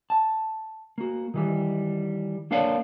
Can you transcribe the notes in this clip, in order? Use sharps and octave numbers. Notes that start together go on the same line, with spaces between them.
A5
A#3 F#4
D#3 E3 G3
A#3 D4 A#4 C#5 D5 F5